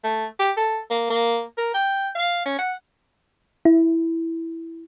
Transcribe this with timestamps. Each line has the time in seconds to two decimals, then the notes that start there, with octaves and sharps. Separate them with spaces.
0.04 A3
0.39 G4
0.57 A4
0.90 A#3
1.10 A#3
1.57 A#4
1.74 G5
2.15 F5
2.45 C#4
2.58 F#5
3.65 E4